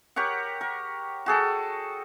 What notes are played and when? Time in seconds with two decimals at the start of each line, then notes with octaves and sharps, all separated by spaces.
0.16 G4 A#4 C#5 F#5
0.61 A#4
1.26 F#4 G#4 A4 G5